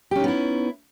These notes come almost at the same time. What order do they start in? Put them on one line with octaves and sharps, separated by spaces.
G4 C#4 D#4 B3 E4